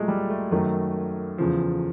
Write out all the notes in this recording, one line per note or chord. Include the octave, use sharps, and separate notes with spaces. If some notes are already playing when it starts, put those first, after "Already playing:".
Already playing: A#2 F#3 G#3 A3
G3
A3
F#2 D#3 F#3 A3
E2 C#3 F3